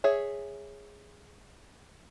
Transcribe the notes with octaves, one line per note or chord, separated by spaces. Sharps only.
G#4 C#5 E5